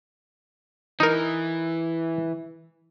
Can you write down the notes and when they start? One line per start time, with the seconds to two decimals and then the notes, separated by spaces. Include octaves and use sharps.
1.00 E3 D#4 A#4